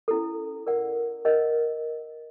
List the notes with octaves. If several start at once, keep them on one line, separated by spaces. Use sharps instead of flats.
C#4 E4 A4
A#4 D5 F#5
A#4 D#5 F#5